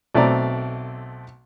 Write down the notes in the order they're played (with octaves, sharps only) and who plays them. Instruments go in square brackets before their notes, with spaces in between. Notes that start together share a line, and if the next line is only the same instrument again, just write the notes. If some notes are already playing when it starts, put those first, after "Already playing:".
[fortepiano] B1 A3 C4 D5 A#5